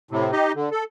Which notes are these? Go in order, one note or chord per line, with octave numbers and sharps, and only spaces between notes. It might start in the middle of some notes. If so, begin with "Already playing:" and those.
A2 C3
D#4 G4 D#5
D3
A4